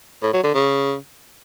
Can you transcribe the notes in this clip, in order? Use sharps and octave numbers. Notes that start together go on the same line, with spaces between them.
A2
F#3
D3
C#3